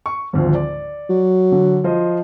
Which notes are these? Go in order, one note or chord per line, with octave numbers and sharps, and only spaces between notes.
C#6
G#1 D2 F3
D5
F#3
D3
F3 C5 D#5